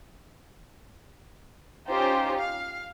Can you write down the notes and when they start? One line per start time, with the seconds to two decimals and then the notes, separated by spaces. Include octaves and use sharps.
1.86 C#4 D#4 F4 G4 C5
2.37 F5